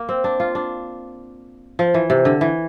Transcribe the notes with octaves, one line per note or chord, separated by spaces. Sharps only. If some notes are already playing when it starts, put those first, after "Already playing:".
Already playing: A#3
C4
D4
F4
D4
F3
E3
C3
D3
E3